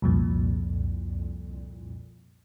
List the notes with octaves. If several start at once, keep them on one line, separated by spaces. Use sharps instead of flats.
C2 F2 A#2